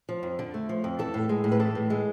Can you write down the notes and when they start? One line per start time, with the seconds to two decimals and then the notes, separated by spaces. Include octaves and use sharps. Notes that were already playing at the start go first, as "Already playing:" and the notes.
0.09 F3
0.23 F2
0.39 D3
0.54 A3
0.69 F3
0.84 F2
0.99 E3 A4
1.14 A2
1.29 G#3
1.44 A2
1.52 B4
1.60 E3 A4
1.75 A2
1.90 G#3